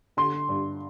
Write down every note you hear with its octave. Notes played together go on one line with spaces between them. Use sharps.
D3 C6
G2